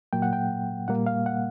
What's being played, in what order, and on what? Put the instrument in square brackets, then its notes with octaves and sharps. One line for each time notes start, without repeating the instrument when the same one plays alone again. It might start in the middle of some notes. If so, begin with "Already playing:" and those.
[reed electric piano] A#2 F#3 A#3 G5
F#5
G5
A#2 G3 A#3 F#5
F5
F#5